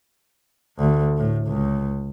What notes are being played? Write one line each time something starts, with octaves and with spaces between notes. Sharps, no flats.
D2
A2
C#2